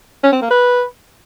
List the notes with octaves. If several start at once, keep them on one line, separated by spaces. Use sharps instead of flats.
C#4
C4
A#3
B4